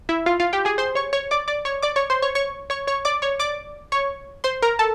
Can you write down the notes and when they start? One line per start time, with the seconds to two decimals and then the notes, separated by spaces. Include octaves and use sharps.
0.09 E4 E5
0.26 F4 F5
0.40 F4 F5
0.53 G4 G5
0.65 G#4 G#5
0.78 C5 C6
0.95 C#5 C#6
1.13 C#5 C#6
1.31 D5 D6
1.48 D5 D6
1.65 C#5 C#6
1.82 D5 D6
1.96 C#5 C#6
2.10 C5 C6
2.22 C#5 C#6
2.35 C#5 C#6
2.70 C#5 C#6
2.87 C#5 C#6
3.05 D5 D6
3.22 C#5 C#6
3.39 D5 D6
3.92 C#5 C#6
4.44 C5 C6
4.62 A#4 A#5
4.79 A4 A5